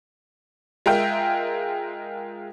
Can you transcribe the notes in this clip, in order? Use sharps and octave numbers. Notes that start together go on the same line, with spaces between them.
G#3 F4 A#4 E5 G5